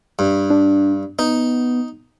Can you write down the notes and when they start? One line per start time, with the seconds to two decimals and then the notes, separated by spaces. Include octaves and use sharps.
0.19 G2
0.50 D4
1.19 B3 D#4